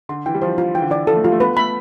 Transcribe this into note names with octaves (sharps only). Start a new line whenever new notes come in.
D3 C6
E3 G5
G3
F3 C5
F4
E3 G5
D3
E3 D5
F3 A4
A3
G3 F4
A3
B3 B4
A3 B5